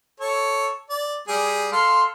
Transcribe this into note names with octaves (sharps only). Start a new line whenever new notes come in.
A4 C#5
D5
G3 G#4
A4 F5 C6